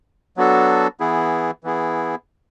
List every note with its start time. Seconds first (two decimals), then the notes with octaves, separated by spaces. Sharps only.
0.37 F#3 B3 D4 F#4 A4
1.00 E3 B3 E4 G#4
1.63 E3 B3 E4 G#4